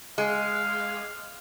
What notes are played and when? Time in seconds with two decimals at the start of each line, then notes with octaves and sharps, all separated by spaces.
0.18 G#3 F5